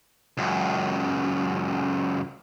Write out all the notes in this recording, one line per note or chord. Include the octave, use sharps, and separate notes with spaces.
C#2 F#2